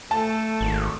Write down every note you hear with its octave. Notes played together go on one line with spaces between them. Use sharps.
A3 A4 A5
G#1